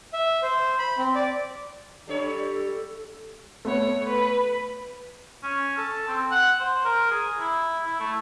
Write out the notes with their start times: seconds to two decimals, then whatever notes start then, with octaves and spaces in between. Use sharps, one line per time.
0.13 E5
0.43 C5
0.79 B5
0.98 C4
1.15 D5
2.08 G3 D4 A4 C#5
3.65 A3 B3 C#5
4.08 B4
5.43 C#4
5.77 A4
6.08 C4
6.32 F#5
6.60 C5
6.85 A#4
7.11 G#4
7.40 E4
7.86 E4
8.00 A3